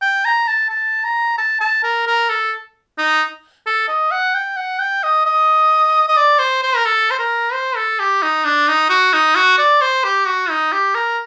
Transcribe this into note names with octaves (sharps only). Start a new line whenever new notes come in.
G5
A#5
A5
A5
A#5
A5
A5
A#4
A#4
A4
D#4
A4
D#5
F#5
G5
F#5
G5
D#5
D#5
D#5
D5
C5
C5
A#4
A4
C5
A#4
C5
A4
G4
D#4
D4
D#4
F#4
D#4
F#4
D5
C5
G4
F#4
D#4
G4
A#4